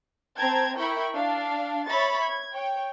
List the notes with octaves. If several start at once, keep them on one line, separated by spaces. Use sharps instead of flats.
C4 G5 A5 A#5 G#6
E4 A#4 G5 B5 C#6
D4 F5
C#5 E5 B5 C#6 A6
G#6
C#5 G5